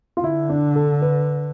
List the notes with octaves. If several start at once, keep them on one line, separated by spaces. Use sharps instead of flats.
F4
D3 E4
D4
A4
B4